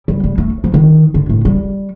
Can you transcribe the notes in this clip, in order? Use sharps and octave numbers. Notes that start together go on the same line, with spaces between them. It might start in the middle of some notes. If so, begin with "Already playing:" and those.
G3
G3
A3
F3
D#3
D3
A2
G3